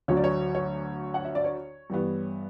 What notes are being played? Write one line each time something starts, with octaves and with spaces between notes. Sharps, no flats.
D2 D3 F#3 C#5
D5
C#5
C#5
F#5
E5
D5
C#5
G2 E3 G3 B3